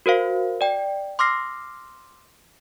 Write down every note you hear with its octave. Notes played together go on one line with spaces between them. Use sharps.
F#4 A#4 C5 F5
D5 G5
C6 D6 E6 F6 A#6 C7